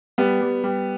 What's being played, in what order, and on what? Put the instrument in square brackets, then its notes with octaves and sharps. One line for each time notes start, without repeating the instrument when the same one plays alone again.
[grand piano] G3 B3
G3
G3